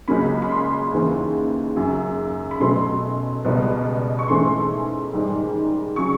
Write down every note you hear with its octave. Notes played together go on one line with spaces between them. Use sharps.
C#2 C#3 F#3 A#3 C#4 B5
B5
C6
D#2 C#3 E3
F#2 C#3 F#3
B5
B2 F#3 A3 C#4 C6
C#2 B2 G3 B3
C#6
G#2 E3 A3 C#4 C6
G#2 D#3 G3
C#3 F#3 C#6